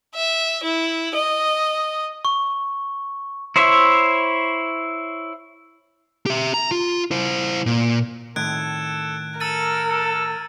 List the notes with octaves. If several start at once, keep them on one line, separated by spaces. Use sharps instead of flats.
E5
E4
D#5
C#6
E4 C5 C#5 E5
G4 E5
A#5
F4
E4 C5
A#2
A2 D#3 A4 F#6 G#6 D7
A4 A#4 E6 A6 D#7
A4